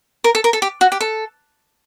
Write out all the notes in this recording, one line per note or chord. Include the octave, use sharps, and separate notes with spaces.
A#4
A4
A#4
A4
G4
F#4
G4
A4